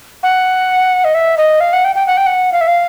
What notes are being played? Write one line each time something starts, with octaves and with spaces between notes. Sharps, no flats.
F#5
D#5
E5
D#5
F5
F#5
G5
G5
F#5
G5
F#5
F5
E5
F5